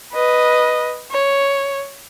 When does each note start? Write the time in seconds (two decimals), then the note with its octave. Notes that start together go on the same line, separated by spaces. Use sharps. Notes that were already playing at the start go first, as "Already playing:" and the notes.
0.13 B4 D#5
1.11 C#5